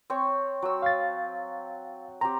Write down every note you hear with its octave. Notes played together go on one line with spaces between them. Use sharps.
C4 C#5
F#3 E6
F5 A6
C4 G4 A#5